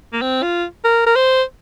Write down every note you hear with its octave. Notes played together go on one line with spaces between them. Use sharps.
A#3
C4
F4
A#4
A#4
C5